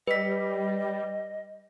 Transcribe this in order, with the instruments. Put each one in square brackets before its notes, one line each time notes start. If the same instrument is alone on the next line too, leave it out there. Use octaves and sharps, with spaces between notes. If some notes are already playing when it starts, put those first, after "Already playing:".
[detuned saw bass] G3 [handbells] B4 B6 [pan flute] D#5